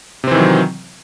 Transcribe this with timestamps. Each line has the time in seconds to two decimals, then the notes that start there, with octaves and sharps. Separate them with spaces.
0.24 C3
0.27 C4
0.31 E3
0.35 D#3
0.39 F#3